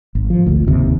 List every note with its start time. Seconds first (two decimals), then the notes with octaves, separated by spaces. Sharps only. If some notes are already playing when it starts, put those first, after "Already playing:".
0.15 G#1
0.30 F3
0.47 G#1 D2
0.67 F#1 D#2 C3